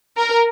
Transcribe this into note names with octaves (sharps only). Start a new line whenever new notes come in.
A#4